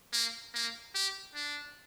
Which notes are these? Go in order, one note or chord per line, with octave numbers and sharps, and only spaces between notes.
A#3
A#3
G4
D4